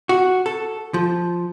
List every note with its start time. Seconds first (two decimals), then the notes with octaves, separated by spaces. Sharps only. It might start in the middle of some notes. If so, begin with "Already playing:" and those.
0.09 F#4
0.46 A4
0.94 F3